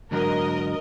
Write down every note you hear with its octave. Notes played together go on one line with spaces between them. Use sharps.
G#2 D3 F#3 A#4 D#5